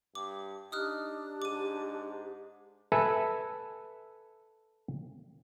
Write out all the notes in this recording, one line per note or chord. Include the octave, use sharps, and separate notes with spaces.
G2 D6
D4 D#4 G4 D#6 F6 F#6
G#2 D6 D#7
A4 B4 E5 G#5